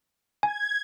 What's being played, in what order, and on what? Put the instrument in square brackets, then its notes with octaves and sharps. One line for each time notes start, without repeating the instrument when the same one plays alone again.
[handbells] G#5 [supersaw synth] G#6